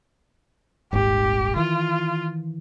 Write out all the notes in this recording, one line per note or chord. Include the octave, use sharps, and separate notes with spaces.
D#1 G#1 G#2 G4
D#3 E3 F4